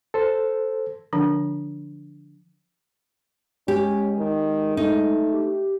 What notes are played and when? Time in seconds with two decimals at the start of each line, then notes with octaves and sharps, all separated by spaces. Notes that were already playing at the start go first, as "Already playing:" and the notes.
0.14 A4 C5
1.13 D3 F3 D4
3.68 G#3 C#4 G4
4.18 D#3
4.77 A3 D#4
5.33 G4